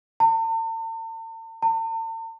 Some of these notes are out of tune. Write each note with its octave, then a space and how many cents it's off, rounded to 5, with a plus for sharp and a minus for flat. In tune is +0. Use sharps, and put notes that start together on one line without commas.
A5 +45
A5 +45